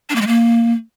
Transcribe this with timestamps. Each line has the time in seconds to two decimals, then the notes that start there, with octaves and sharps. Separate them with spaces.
0.10 D4
0.16 A#3
0.21 G#3
0.27 A#3